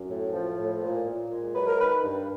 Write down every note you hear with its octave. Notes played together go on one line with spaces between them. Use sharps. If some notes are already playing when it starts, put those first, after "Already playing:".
Already playing: F#2
A2
F3
A2
A#2
A#2
G#3
F#3 B4
A#4
D#3 B4
G2